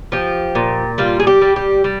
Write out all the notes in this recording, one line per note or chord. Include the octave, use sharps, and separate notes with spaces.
F3 G4
A#2
G3 F4
G#4
G4
G3
G4
G3